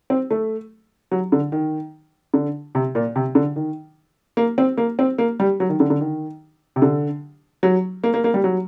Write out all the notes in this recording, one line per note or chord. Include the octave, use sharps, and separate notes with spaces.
C4
A3
F#3
D3
D#3
D3
C3
A#2
C3
D3
D#3
A#3
C4
A#3
C4
A#3
G3
F#3
D#3
D3
D3
D#3
C3
D3
F#3
A#3
A#3
A#3
G3
F#3